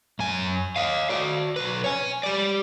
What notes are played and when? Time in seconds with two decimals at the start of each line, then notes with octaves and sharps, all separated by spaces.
0.19 F#2 G#5
0.76 D#5 F5
1.10 F#4 D5
1.56 B1 B4
1.84 C#5 G#5
2.23 G4 D5